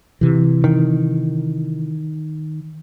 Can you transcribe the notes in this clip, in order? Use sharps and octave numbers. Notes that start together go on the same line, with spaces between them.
C3 E3
D#3